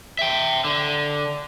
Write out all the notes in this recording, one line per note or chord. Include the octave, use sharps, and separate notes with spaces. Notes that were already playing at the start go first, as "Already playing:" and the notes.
E5 G5
D3